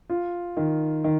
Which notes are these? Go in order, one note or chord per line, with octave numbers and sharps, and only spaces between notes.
F4
D#3
D#3